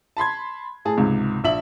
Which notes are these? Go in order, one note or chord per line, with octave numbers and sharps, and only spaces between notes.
A5 B5 C6 G#6
A2 G#4 A5
C#2 G#2 C3
A#1 E5 F#7